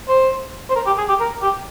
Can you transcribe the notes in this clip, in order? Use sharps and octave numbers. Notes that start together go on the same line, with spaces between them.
C5
C5
A#4
G4
G#4
G4
A#4
G4